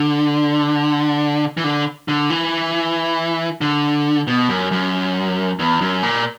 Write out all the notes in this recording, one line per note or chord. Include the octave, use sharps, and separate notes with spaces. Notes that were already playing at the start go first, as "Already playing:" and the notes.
Already playing: D3
E3
D3
D3
E3
D3
B2
F#2
F#2
E2
F#2
A#2